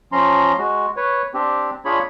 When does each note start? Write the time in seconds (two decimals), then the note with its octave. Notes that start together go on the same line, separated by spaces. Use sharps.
0.12 F3 C#4 A#5 C6
0.58 G#3 F#4
0.97 B4 C#5
1.34 C4 D4 G4
1.85 D4 F4 G#4 C#5 B5